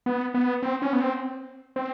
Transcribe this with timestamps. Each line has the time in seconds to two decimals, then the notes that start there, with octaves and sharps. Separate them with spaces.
0.06 B3
0.34 B3
0.62 C4
0.82 C#4
0.93 B3
1.00 C4
1.76 C4